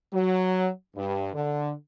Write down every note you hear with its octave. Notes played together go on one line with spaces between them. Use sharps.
F#3
G2
D3